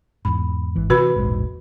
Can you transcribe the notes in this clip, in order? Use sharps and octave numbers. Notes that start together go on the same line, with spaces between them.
E2 G#2 B5
G#1 E3
C3 E3 F#4 B4 B5
E1 A#1 G#2